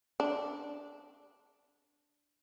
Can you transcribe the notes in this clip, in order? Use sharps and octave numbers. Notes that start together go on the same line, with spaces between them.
D4